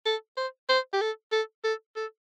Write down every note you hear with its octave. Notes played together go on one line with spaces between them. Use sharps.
A4
C5
C5
G4
A4
A4
A4
A4